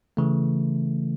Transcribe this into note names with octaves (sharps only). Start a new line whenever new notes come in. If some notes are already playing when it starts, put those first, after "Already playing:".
C#3 E3 A3